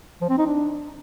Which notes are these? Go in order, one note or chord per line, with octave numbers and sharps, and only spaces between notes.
F3
C4
D#4
D4